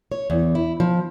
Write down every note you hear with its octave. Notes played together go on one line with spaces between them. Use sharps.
C#5
E2
E4
F3